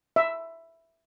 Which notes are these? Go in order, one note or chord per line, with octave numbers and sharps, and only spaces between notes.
E5